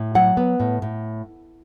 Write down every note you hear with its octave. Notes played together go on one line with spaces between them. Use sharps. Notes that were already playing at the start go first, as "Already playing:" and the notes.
Already playing: A2
F#3 F#5
B3
A2
A2